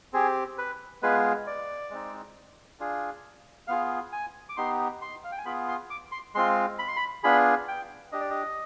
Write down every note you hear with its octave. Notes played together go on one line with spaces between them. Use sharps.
C4 G4 G#4
B4
G#3 B3 F4 G#4 B4
D5
G#3 C4 D#4
D4 F4 G#4
B3 F4 G#4 F5
G#5
D6
B3 D#4 G4 C6
C6
F5
G5
G#5
B3 F4 G#4 B5
C6
D6
C6
G#3 C4 F4 C6
B5
C6
B5
B3 D4 F4 G#4 B5
G5
D4 G4 D#5
D5
D#5